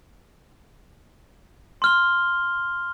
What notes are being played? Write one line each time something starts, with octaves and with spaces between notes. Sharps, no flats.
C6 F6 G7